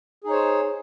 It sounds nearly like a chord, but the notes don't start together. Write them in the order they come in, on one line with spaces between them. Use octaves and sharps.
G#4 D#4 C#5 C5